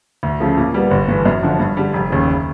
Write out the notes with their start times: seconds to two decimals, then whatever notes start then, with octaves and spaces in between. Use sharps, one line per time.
0.23 D2
0.40 C#3 F3 A3
0.57 A#2
0.74 G3 B3
0.91 G1
1.08 G2 E3 A3
1.26 F#2
1.42 D3 F3
1.60 G2
1.77 D3 G3
1.93 F1
2.10 D#2 C#3
2.28 F#1